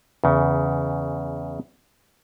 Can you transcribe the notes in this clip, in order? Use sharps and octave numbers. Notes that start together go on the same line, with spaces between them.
E2 C#3